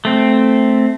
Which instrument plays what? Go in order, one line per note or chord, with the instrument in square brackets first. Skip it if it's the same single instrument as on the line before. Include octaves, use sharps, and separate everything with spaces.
[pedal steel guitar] A3 C4